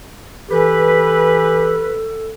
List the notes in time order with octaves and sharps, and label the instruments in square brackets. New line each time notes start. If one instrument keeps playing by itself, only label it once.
[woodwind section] E3 G4 B4 [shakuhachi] A4